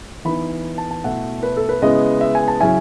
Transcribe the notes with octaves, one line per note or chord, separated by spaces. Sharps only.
E3 B3 D#4 B5
A5
A5
B2 A3 E4 F#5
B4
A4
B4
C#3 G#3 B3 E4 D#5
E5
G#5
A5
C#3 F#3 C#4 E4 G#5